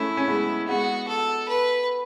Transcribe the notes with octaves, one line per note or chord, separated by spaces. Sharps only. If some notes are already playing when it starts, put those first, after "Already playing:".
Already playing: A3 C#4 E4
C#4
G#3 B3
G#3 B3 F#4
A4
B4